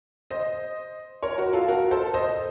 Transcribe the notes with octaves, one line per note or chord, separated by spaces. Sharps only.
C5 D#5
A#4 C#5
F#4 A#4
F4 A4
F#4 A#4
A4 C5
C5 D#5